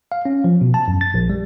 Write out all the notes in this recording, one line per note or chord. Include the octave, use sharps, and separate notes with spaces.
F5
C#4
F3
B2
A5
F#2
A6
A#1
G3